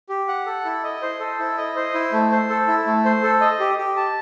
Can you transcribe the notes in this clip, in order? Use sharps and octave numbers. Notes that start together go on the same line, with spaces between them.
G4
F#5
A4
E4
D#5
C5
A4
E4
D#5
C5
E4
A3
C5
A4
E4
A3
C5
A4
D#5
G4
G4
A5